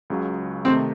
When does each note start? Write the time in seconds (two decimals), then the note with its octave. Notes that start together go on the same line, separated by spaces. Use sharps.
0.10 C#2 C#3 F#3
0.65 C3 D#3 A3 C4 D#4 A4